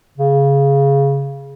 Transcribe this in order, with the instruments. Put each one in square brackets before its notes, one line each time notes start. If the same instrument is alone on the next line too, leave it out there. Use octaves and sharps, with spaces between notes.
[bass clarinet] C#3